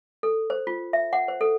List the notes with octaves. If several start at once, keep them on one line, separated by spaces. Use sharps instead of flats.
A4
C5
F4
E5
F#5
C5
A4